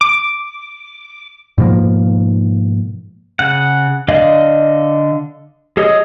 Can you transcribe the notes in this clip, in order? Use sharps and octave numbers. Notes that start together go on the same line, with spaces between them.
D6
G#2 B2 F3 A#3
C#3 F#5
D3 D5 D#5 F5
G#4 A4 C#5 D#5 D#6